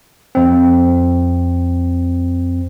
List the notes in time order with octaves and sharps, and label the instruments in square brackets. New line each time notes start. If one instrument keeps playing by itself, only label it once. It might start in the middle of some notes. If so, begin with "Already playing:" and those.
[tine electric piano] F2 C4